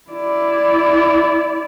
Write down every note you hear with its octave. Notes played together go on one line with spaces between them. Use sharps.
E4 D5